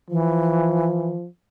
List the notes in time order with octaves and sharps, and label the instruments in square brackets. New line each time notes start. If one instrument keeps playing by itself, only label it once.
[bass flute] E3 [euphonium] F3